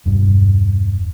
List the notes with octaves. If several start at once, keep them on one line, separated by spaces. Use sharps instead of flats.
E1 G2